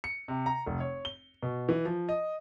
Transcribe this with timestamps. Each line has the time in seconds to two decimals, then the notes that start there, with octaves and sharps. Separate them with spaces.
0.04 C#7
0.28 C3
0.46 A#5
0.66 F1
0.80 C#5
1.05 G7
1.43 B2
1.69 E3
1.85 F3
2.09 D#5